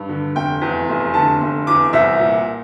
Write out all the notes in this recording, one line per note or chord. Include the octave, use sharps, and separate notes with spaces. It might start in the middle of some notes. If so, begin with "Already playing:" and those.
Already playing: G2
D3
F1 G5
E2
F1
D3 A5
F1
E2 D6
C2 E5
A#2